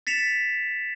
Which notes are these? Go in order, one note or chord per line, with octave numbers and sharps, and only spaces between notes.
A6 B6 C#7 E7 F7